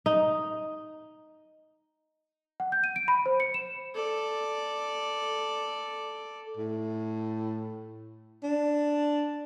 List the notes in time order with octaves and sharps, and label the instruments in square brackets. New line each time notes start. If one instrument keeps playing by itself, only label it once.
[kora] D#4
[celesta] F#5
G6
D#7
D7
B5
C5
C#7
E7
[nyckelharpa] A4 D5
[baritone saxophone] A2
D4